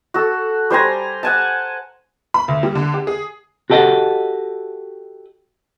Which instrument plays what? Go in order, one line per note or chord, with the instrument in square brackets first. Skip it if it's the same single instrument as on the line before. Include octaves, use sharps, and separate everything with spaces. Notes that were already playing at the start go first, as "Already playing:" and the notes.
[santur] F#4 A4
G3 C5 G#5 A#5
F#5 G#5 A5
[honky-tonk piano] B5
D2
G3
D3
G4
G#4
[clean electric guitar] F#4 G4 A4 D#5 F#5